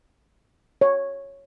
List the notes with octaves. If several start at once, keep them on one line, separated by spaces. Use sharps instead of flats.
C#5